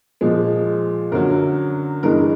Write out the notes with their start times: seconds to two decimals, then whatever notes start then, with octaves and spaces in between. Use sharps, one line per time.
0.21 A#2 F3 G#3
1.12 F#2 D3 F#3 A#4
2.03 G2 E3 G#3 A#4